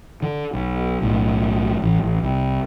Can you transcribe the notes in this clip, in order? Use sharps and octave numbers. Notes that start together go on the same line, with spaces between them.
D3
B1
B1 A2
A1
A1
C2